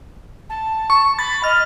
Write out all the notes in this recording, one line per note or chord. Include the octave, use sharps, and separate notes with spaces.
A5
C#6
B5 A6
D#5 F6